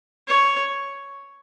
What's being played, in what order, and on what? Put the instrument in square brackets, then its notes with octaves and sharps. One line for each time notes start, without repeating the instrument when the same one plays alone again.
[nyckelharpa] C#5